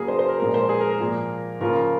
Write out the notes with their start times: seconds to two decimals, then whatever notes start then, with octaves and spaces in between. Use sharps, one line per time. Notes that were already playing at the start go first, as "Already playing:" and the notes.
Already playing: C#3 F#3 A#3 G#4 A#4
0.08 C5
0.19 C5
0.28 A#4
0.39 A#2 F3 G#3 C4 A#4
0.54 C5
0.69 G#4
0.80 A#4
0.91 A#4
1.00 A#2 F3 A#3
1.60 C#3 F3 A#3 F4 A#4